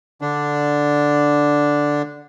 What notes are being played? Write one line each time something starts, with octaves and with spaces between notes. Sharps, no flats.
D3 D4